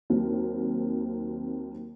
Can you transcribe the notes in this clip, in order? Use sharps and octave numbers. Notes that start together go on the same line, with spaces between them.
D#2 F#3 A#3 C4